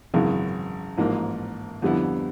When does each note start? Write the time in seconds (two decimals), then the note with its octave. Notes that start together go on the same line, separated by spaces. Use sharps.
0.14 G#1 F#2 C#3 E3
0.98 A1 G#2 F3 A#3
1.82 F2 D3 G3 B3 E4